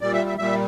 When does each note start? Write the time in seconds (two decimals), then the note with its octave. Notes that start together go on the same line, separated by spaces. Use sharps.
0.01 A#2 G3 D5
0.13 E5
0.27 E5
0.38 A#2 G3 E5